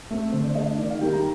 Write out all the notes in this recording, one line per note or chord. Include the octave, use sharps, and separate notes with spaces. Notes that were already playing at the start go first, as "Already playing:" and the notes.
A3 C4
D3 C5
D5
A3 D4 D#5
D#3 D5
F5
G3 A#3 D#4 G5
A#5